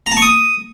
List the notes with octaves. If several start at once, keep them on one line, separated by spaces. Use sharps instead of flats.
A#5
A5
C#6
D#6